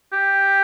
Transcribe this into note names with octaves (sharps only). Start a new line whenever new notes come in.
G4